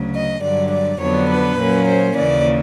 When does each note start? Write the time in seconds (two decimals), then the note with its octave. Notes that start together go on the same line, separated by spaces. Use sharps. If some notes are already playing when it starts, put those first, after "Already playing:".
Already playing: D2 C#3 F#3
0.14 D#5
0.43 G2 D3 F#3 D5
0.73 D5
1.01 F2 D3 F#3 B3 D4 C#5
1.31 B4
1.59 A#2 F#3 A#3 C#4
1.88 C5
2.17 D#2 C#3 E3 D5